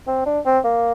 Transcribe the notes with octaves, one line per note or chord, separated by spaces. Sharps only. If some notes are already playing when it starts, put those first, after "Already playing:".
C4
D4
C4
A#3